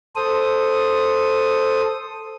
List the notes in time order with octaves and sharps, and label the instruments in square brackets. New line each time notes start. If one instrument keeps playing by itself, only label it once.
[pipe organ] A4 C5 D#6